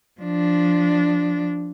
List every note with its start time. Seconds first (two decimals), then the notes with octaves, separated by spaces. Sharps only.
0.21 F3 D4